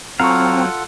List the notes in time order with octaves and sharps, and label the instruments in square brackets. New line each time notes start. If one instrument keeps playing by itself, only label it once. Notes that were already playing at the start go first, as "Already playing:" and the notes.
[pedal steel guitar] F#3 F5 [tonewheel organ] C4 [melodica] F4 A4 F#5 [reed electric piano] A#5 C#6